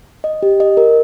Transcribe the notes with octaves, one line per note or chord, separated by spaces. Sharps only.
D#5
G4
D#5
A#4